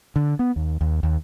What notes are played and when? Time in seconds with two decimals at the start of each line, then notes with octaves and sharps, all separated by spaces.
0.16 D3
0.39 B3
0.56 D#2
0.81 D#2
1.03 D#2